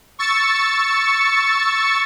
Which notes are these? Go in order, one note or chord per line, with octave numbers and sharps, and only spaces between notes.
C#6 E6 A6 C#7